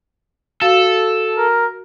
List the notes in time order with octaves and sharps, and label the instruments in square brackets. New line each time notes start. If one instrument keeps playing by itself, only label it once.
[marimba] F#4 F5 A6 [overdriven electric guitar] A4
[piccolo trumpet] A#4